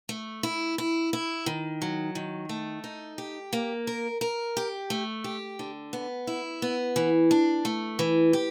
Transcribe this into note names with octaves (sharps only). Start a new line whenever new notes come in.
A3
E4
E4
E4
D#3
F#3
D#3
A3
D#4
G4
A#3
A#4
A#4
G4
A3
G4
D3
B3
E4
B3
E3
D4
A3
E3
G4